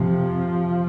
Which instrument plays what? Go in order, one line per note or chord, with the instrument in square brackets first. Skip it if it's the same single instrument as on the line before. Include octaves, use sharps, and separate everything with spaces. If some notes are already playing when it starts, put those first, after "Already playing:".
Already playing: [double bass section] F2 C3 F3